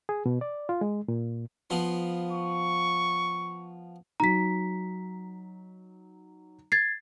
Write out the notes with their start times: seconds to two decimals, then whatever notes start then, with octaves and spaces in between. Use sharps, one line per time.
0.09 G#4
0.26 B2
0.41 D5
0.69 F4
0.81 G#3
1.08 A#2
1.70 F3 B3 C6
2.32 C#6
4.20 F#3 D#4 A#5 B6
6.72 G#6 A6 C7